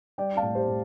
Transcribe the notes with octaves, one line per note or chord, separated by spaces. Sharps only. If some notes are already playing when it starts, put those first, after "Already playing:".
G3 D5 G5
F5 A5
A2
G4 C5
A2